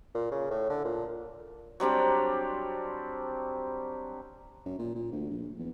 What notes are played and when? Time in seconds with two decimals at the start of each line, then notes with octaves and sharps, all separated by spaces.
0.14 A#2
0.31 C#3
0.51 A2
0.69 D3
0.85 A#2
1.80 F#3 G3 C4 D4
4.66 F#2
4.79 A#2
4.95 A#2
5.12 D2
5.30 A#1
5.59 E2